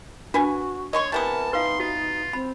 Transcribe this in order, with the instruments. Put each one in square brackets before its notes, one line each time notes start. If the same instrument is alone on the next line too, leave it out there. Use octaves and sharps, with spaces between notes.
[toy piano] D4 [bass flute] F#4 [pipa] B4 G#5
[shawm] C#5 [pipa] D#5 C6 C#6
[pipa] C3 E3 B3 [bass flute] A#4 [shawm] A5
[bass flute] D#4 [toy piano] B4 F5 [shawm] C6
[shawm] F4 [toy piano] F#4
[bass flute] C4 [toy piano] B5